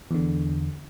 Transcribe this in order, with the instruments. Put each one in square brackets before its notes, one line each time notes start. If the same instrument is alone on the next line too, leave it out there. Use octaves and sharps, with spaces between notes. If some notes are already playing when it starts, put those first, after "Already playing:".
[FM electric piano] E2 D3